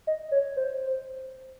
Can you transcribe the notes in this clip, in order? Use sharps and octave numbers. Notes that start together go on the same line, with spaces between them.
D#5
C#5
C5